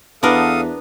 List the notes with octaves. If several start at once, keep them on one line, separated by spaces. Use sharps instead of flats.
E2 B3 D4 A4 A#4 F5 D#6